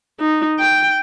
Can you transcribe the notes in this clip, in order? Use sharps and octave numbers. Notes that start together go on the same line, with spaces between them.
D#4
G5